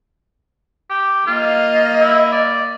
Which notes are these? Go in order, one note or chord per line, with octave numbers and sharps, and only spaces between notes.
G4
A#3 F4 D#5
E4
D5